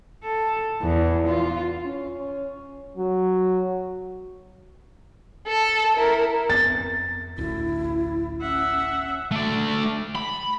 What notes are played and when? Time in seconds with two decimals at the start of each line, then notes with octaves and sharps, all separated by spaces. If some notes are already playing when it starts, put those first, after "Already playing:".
0.24 A4
0.82 E2
1.28 F4
1.86 C#4
2.97 F#3
5.47 A4
5.97 E4 A#4
6.50 F2 B3 A6
7.38 A1 D2 E4
8.41 C#4 E5 F#5
9.31 A3 D5
10.16 B5